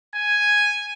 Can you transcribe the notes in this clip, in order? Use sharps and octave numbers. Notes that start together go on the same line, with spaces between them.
G#5